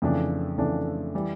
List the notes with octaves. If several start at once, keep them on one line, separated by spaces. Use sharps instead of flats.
F2 C#3 E3 A3 D4
F2 C#3 E3 A3 D4
E3 G3